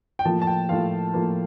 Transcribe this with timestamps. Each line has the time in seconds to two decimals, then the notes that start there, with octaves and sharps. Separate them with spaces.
0.19 G5
0.25 A2 F3 A#3 F4 A5
0.42 A5
0.47 G5
0.69 A2 F3 A#3 F4 F5
1.14 A2 F3 A#3 F4